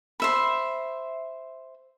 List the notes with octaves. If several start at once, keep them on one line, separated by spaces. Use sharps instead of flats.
C5 E5 B5